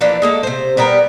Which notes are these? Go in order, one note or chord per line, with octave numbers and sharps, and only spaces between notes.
E3 F3 A#3 D4
G#3 A#3 A4
C3 C5
G3 B3 G4 A#4